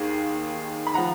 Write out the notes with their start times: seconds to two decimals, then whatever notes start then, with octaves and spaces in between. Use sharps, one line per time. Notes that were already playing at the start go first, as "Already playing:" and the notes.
Already playing: D#2 D#3 G#4
0.87 B5
0.94 F3 F#5 A#5